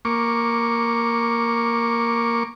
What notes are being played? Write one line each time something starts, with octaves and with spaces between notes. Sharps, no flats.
A#3 C#6 D6